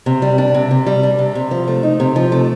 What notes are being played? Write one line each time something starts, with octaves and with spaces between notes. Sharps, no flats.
C3
G3
D4
C3
C3
G3
D4
C3
C3
F3
A3
D#4
C3
F3
A3